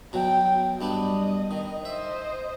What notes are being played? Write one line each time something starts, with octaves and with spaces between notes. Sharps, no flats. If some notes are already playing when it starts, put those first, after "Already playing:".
B2 F#3 G5
G2 B3 D4 D#5
D#3
C5 D#5 E5